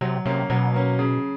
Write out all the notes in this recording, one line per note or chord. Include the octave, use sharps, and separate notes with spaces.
C3 F#3
C3 A#3 C#4
B2 F#3
A#3 C#4
C#3